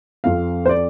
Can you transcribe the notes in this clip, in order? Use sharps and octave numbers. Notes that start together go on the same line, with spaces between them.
F2 F3 C4 F5
C5
D5